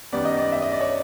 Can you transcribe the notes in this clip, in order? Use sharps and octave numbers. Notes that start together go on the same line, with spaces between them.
F#2 D#3 G3 B3 D5
D#5
D5
E5
D#5
D5
C#5